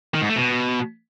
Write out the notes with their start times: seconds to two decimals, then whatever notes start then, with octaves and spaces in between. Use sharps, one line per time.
0.14 D#3
0.22 G#2
0.29 A3
0.36 B2